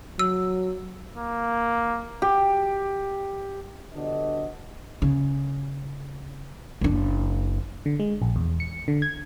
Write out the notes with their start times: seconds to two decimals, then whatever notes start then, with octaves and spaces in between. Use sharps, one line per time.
0.19 F#3 E6
1.16 A#3
2.22 G4
3.93 G1 D3 D4 F#4 D#5
5.02 C#3
6.81 F#1 D4
7.86 D3
8.00 G#3
8.22 A#1
8.36 E2
8.60 C#7
8.88 D3
9.02 G#6